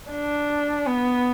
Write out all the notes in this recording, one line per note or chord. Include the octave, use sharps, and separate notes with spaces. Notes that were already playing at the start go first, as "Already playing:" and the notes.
D4
B3